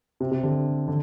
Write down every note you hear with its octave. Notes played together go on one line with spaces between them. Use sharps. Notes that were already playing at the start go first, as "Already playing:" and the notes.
C3
C3
D3
D3